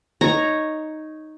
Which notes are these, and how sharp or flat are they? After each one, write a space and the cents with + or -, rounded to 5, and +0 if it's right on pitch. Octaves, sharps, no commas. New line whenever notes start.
D#4 +0 C#5 -5 A#5 +0